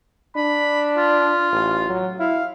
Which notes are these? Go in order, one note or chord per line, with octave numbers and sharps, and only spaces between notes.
D4 B5
F4
A1
F#3
E4 F5